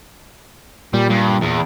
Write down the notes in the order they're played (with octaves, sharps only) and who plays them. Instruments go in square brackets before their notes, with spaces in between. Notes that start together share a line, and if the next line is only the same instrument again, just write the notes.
[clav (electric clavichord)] A#2 [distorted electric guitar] G3
[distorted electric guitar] G2
E2